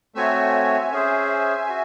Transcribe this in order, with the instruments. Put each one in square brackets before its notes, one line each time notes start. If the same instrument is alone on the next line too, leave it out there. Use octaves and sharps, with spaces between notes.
[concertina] A3 C4 F#4 C#5 [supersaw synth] E5 G#5
[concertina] C#4 G#4 C5
F#4